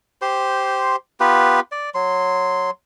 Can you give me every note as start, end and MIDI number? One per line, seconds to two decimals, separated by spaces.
0.22 0.96 67
0.22 0.96 72
0.22 0.96 84
1.20 1.60 59
1.20 1.60 65
1.20 1.60 67
1.20 1.60 71
1.72 1.90 74
1.95 2.70 54
1.95 2.70 84